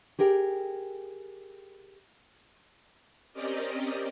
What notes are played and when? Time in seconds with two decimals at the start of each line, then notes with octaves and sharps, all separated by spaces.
0.19 G4 G#4 A#4 G5
3.33 C4 C#4 G4 A#4 D5 D#5